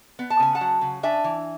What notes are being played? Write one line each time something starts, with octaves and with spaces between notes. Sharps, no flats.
B3
A5
C#3 G#5
F#5 A5
F#3
C#3
D4 E5 G#5
E3